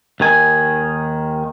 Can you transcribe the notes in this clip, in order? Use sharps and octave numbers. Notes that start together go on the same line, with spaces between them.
D#2 D#3 G#5